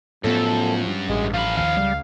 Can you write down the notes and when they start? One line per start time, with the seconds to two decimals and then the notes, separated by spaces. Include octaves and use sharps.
0.24 F#2 A2 F3 B3 A4
0.86 G2
1.09 A1 G#3
1.34 F3 F5 B5
1.57 D#2 F5
1.77 C#2 G3